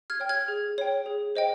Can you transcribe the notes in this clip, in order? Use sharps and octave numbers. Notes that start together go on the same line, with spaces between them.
F6 G#6
C#5 G5
F6 G#6
G#4
C#5 G5
G#4
C5 D#5 G5